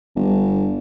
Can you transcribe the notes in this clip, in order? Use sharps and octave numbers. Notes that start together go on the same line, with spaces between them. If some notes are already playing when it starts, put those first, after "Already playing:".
G1